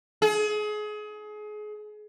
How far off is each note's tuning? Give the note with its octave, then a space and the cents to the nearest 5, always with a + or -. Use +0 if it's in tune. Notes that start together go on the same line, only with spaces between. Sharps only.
G#4 +30